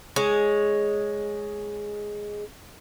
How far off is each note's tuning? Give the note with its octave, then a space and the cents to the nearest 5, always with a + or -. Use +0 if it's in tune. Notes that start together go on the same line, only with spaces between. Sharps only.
G#3 +0 C#5 +0